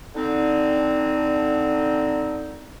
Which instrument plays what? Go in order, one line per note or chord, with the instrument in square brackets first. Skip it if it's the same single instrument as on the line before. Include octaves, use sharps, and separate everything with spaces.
[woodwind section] D3 C4 D#4